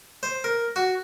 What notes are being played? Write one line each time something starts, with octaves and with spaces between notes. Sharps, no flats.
C5
A#4
F#4